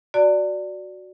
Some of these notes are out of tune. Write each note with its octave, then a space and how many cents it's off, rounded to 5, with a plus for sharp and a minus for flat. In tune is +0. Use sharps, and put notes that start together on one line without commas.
F#4 +0 D5 +0 A5 +45